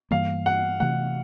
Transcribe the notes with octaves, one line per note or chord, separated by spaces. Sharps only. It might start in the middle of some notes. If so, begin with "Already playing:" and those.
G2 E3 G3 A#3 F5
F#5
C3 E3 A3 F#5